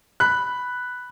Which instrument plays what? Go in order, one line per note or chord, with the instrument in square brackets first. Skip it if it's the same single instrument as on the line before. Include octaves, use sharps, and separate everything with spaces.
[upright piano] B5 F#6